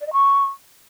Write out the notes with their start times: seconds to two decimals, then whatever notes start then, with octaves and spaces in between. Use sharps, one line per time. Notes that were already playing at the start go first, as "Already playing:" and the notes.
0.01 D5
0.07 D#5
0.13 C#6